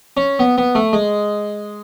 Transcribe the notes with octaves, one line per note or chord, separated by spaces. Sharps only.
C#4
B3
B3
A3
G#3